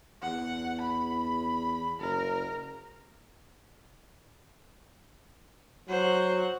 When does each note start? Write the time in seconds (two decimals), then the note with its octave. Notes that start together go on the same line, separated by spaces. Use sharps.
0.22 E2 F#5
0.81 B5
1.99 F#1 A#4
5.89 F#3 F#4 C5 F#5